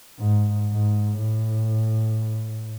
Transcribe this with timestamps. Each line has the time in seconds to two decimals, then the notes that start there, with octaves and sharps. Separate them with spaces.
0.19 G#2
0.72 G#2
1.18 A2